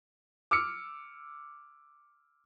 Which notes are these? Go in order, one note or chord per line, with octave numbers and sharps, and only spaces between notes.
D6 E6 F6 C#7